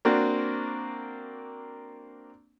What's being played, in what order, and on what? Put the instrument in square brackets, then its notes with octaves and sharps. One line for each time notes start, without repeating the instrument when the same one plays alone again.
[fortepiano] A#3 C4 D4 F#4